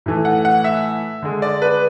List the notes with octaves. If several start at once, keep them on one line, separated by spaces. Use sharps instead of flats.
A2 E3 A3
F#5
F#5
E5
D3 G#3
D5
B4